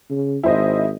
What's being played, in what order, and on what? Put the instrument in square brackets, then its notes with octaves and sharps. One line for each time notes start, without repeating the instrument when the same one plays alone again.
[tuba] C#3
[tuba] G#1 [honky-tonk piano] E4 C5 D#5